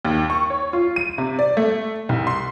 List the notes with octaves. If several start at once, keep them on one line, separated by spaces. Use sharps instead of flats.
D#2
C#6
C#5
F4
D#7
C3
D5
A3
C2
C6